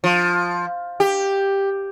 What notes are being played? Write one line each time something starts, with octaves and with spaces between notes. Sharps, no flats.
F3
G4